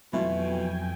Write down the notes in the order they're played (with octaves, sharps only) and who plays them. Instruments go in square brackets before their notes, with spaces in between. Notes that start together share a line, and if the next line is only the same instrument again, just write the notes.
[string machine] F2 G5 G#5 [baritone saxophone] B2 [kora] E3 A3 F4 [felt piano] F#3